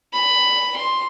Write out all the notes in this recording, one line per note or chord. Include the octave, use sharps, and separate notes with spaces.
B5
C6